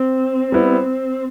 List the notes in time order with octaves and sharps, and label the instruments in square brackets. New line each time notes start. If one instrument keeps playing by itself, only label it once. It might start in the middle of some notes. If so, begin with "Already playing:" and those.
Already playing: [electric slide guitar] C4
[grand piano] G3 B3 E4